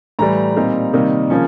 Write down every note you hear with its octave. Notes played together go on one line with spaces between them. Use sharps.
A2 E3 G3 A#5
A#2 G3 C4 D#4
C3 D#3 G3 A#3 D#4
C#3 F3 A#3 C#4